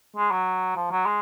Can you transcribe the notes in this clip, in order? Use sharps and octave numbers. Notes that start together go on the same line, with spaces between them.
G#3
F#3
F3
F#3
G#3